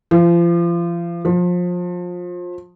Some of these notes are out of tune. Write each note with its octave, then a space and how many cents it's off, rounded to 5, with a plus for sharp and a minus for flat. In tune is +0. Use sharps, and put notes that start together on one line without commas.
F3 -35
F3 +25